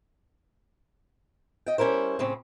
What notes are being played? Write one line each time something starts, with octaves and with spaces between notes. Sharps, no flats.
D#5 G5
G3 C#4 E4 A#4 C5
A2 C#3 C4 C#4